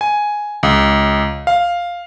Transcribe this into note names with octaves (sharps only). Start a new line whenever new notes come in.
G#5
C#2
F5